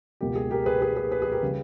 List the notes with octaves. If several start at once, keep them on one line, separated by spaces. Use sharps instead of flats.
C#2 B2 A#3 G4
G#4
G4 A#4
G#4 B4
G#4 B4
G#4 B4
G#4 B4
G#4
G4 A#4
C#3 G3